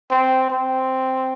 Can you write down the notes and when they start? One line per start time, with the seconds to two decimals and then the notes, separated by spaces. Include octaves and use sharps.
0.11 C4
0.50 C4